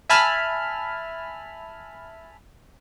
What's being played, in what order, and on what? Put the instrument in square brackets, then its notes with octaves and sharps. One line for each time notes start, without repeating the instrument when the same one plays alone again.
[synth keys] E5 G#5 A5 B5 F6